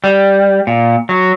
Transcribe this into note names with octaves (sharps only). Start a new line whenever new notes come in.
G3
A#2
F#3